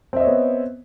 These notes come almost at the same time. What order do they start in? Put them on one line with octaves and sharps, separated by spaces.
C4 E5 D#5 C#5 B3